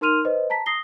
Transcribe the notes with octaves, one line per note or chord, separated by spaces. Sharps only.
D#4 A#4 C6 F6 D#7 F7
B4 C5 D#5
A5 A#5 B6
D#6 A#6 C7 G7